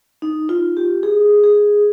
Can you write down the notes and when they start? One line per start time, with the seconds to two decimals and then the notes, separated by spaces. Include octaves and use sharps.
0.22 D#4
0.49 F4
0.77 G4
1.03 G#4
1.44 G#4